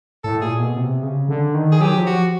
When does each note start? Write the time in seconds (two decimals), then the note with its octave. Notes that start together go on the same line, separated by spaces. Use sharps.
0.24 A2 A4
0.41 A#2 G#4
0.59 B2
0.76 C3
1.03 C#3
1.29 D3
1.54 D#3
1.72 G#4
1.80 F#3 G4
1.97 F3
2.06 F#4